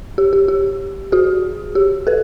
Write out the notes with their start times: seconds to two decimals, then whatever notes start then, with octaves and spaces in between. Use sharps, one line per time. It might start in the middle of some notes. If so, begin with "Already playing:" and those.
0.18 G4
0.33 G4
0.48 G4
1.12 F#4 G#4
1.75 G4
2.07 A4 B4